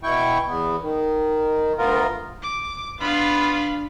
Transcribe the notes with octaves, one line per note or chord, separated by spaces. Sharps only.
B2 E4 G5 C#6
E2 B3
D#3
D2 B3 F4 A#4
D6
B3 D4 F4 F5 B5